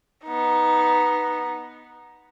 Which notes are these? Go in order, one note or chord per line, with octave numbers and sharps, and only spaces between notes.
B3 D#4